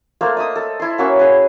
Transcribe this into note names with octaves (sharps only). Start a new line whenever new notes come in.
A3 A#3 C5
D#5 E5 D#6
A4
E4 C6
A#3 C#4 F#4 E5
G#4 B4